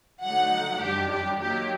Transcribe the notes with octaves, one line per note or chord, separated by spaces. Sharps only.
D3 F#3 A3 D#4 F#5
F#2 D#3 G3 D4 G4
G4
D#3 F#3 A#3 G4